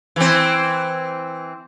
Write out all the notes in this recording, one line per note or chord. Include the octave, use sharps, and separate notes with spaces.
E3 C4